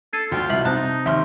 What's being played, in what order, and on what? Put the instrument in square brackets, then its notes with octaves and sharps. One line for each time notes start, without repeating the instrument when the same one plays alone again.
[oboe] A4 [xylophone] G#6 C7 D#7
[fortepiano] D2 [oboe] F4 [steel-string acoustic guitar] F#4 G5
[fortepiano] C2 B2 [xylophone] E5 F#7
[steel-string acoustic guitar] C3 C5 [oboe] D#4 [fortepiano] A5 [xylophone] F#6
[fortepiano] D#2 [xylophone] E5 C6 F6